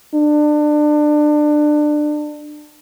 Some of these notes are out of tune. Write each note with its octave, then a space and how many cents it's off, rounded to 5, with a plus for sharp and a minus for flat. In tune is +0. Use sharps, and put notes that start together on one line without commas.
D4 +25